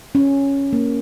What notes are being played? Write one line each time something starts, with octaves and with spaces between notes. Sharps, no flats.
C#4
A#3